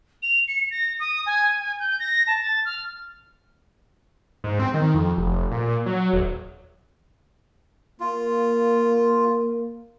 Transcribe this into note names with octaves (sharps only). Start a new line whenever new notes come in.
F7
C#7
A#6
D#6
G#5
G#5
G6
A#6
A5
A6
F6
G#2
C4
D#3
F2
F1
A#2
F#3
D#1
A#3 F4